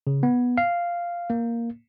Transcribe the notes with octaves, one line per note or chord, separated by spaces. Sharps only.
C#3
B3
F5
A#3